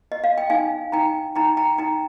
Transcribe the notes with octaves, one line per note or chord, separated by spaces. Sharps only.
D#5
F5
G5
D#4 F5 G#5
D#4 G5 A#5
D#4 G5 A#5
G5 A#5
D#4 G5 A#5